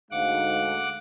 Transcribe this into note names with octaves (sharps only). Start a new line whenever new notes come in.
D2 G#2 F5 F#5 D6